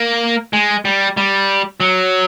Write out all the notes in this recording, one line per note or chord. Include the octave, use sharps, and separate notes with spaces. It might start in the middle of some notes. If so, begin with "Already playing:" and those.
Already playing: A#3
G#3
G3
G3
F#3